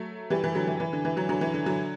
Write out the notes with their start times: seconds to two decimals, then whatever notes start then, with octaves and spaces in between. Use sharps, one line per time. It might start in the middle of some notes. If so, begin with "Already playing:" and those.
Already playing: F#3 A3
0.30 E3 G3
0.44 E3
0.55 D3 F#3
0.67 E3
0.80 E3
0.93 D3
1.05 E3
1.16 D3 F#3
1.29 D3 F#3
1.41 E3
1.54 D3
1.66 D3 F#3